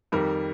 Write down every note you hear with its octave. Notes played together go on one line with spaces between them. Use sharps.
F2 D#3 G3 A#4